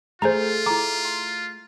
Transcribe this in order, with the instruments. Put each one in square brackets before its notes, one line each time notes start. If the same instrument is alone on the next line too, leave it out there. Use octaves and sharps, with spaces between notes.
[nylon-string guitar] A3 G#4 [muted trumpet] F4 [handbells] C5 A#5
[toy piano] E4 A#5 [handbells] D6
[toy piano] C6